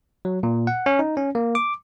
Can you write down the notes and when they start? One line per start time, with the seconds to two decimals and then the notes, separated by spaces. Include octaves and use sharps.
0.25 F#3
0.43 A#2
0.67 F#5
0.86 C#4
0.99 D#4
1.17 C#4
1.35 A#3
1.55 D6